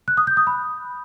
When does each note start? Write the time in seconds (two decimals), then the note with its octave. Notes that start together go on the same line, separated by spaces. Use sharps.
0.08 F#6
0.17 D#6
0.27 G6
0.37 D#6
0.47 B5